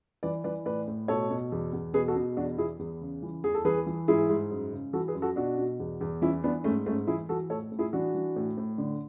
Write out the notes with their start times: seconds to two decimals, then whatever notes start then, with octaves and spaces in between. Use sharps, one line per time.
0.23 E3 B4 D5
0.44 E3 B4 D5
0.66 A2 B4 D5
0.88 A2
1.08 B2 A4 C#5
1.30 B2
1.52 E2
1.73 E2
1.94 B2 G#4 B4
2.08 F#4 A4
2.16 B2
2.37 E2 D4 F#4
2.58 E2 E4 G#4
2.79 E2
3.01 C#3
3.23 E3
3.44 E2 G#4
3.55 A4
3.65 E3 G#4 B4
3.87 E3
4.08 G#2 E4 G#4
4.29 G#2
4.51 F#2
4.73 C#3
4.93 E3 F#4 A4
5.08 G#4 B4
5.15 F#2
5.22 F#4 A4
5.36 B2 D4 F#4
5.58 B2
5.80 E2
6.01 E2
6.22 E3 C#4 E4
6.44 E3 B3 D4
6.64 G#2 A3 C#4
6.86 G#2 A3 C#4
7.07 E3 E4 G#4
7.29 E3 F#4 A4
7.50 A2 A4 C#5
7.72 A2
7.79 E4 G#4
7.93 E3 D4 F#4
8.14 E3
8.36 A2
8.58 A2
8.78 D3